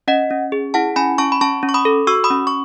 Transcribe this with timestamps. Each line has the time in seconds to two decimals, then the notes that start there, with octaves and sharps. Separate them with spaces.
0.08 C#4 D#5 F#5
0.31 C#4
0.52 G#4
0.74 E4 F#5 A5
0.96 C#4 G#5 B5
1.18 C#4 A5 C#6
1.32 B5
1.41 C#4 A5 C#6
1.63 C#4
1.69 C#6
1.74 B5 D#6
1.85 A4
2.07 F#4 C#6 E6
2.24 B5 D#6
2.31 C#4
2.47 C#6